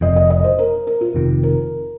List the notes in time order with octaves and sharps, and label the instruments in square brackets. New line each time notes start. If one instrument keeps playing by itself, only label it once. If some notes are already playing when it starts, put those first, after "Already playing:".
[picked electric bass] F1 F2 F3 C4 [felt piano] D#5
[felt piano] D#5
D#5
C5
A#4
A#4
F4
[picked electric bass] F1 F2 C3 D#3
[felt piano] A#4